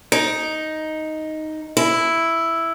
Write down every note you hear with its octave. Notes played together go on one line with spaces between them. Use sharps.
D#4
E4